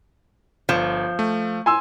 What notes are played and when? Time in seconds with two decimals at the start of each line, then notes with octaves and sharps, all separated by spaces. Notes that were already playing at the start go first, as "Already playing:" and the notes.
0.69 G1 F3 G6 E7
1.19 A3
1.66 G#5 C6 E6